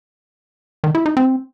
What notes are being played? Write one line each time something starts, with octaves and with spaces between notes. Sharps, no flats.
D#3
E4
D#4
C4